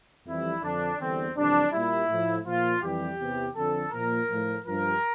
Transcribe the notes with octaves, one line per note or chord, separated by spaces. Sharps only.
F2 E3 G3 E4
F2 D3 F3 D4
E2 D3 G3 C4
F2 C3 E3 G3 D4
A#2 G3 E4
A2 F3
A#2 F3 F4
F2 E3 G3 G4
E2 C3 E3
F2 D3 F3 A4
A#2 F3 A#4
A2 F3
G2 F3 A#4